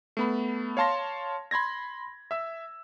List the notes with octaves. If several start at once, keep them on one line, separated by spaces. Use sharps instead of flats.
A3 B3 B5
C#5 F5 A5 C6 A#6
B5 C6 G#6 A#6
E5 E6